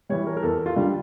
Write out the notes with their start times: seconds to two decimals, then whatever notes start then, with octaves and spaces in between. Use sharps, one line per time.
0.09 E3 G3 C#5
0.27 A#4
0.37 A#4
0.43 E2 A4
0.66 F4
0.76 D3 G3